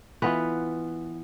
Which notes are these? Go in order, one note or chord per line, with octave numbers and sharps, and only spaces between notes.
E3 B3 F4 B4